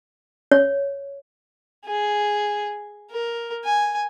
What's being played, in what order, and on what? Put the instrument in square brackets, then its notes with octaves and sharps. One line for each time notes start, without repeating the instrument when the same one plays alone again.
[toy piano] C#5
[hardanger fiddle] G#4
A#4
G#5